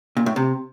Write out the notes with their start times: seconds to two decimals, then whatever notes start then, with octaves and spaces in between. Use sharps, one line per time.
0.17 A#2
0.26 A2
0.36 C3